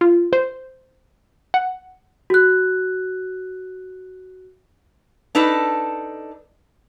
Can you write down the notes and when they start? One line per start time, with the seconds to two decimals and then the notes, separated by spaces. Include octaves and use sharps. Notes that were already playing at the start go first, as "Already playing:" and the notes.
0.01 F4
0.33 C5
1.54 F#5
2.30 F#4 F#6
5.35 D4 D#4 A4 B4